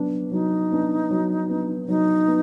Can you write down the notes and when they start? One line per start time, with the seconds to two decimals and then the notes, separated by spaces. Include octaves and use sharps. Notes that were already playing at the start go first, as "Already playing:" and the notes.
Already playing: F#3 B3 D4
0.31 F#3 D#4
0.71 B3 D4
1.11 F#3
1.49 B3 D4
1.88 F#3 D#4
2.27 B3